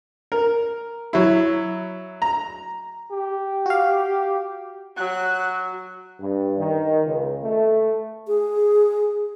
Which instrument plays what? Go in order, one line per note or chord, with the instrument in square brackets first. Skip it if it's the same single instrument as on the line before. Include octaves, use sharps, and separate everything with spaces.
[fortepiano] A#4
F#3 E4
A#5
[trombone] G4
[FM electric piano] F#4 F5
[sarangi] F#3 [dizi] F#6
[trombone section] G2
D#3
C#2
A3
[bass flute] G#4